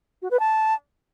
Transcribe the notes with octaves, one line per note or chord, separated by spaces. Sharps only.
F#4
B4
A5